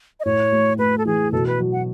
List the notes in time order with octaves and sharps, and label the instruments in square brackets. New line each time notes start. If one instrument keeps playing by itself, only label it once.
[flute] D#5
[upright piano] A2 [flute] C#5
[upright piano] A3
[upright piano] A3 [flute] B4
[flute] A4
[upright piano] E3 [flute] G#4
[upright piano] B2 [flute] A4
[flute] B4
[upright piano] F#3
[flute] F#5